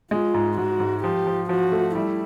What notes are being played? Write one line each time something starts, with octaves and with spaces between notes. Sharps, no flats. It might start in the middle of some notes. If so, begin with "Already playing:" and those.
G#3 F4
G#2
G#2 F#4
G#2
F3 G4
F3
F3 F#4
A3
G3 E4